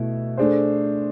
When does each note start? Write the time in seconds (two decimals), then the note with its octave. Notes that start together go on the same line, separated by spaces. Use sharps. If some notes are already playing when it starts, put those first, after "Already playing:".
Already playing: B2 A3 E4
0.38 A3 D4 G#4 C5